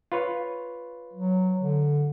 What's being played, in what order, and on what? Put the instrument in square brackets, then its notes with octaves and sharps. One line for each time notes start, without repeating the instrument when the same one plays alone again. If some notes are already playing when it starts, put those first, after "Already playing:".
[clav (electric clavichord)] F4 B4 C#5
[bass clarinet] F#3
D3